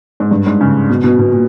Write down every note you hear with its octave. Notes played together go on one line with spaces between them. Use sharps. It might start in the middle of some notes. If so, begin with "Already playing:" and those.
G#2
G2
G#2
C#3
B2
B2
B2
A#2